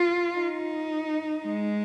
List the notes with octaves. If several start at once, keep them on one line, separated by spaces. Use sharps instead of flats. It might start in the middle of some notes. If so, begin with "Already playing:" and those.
Already playing: F4
D#4
G#3